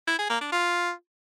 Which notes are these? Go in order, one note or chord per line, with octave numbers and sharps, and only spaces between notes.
E4
G#4
A#3
D4
F4